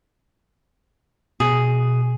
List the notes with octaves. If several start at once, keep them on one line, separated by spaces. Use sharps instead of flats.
B2 G#4